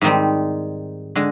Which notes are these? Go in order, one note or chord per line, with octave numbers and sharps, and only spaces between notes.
G#2 D#3 G3 C4 D#4
D3 G#3